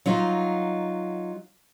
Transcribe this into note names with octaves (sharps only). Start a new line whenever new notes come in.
F#3 D#4 F4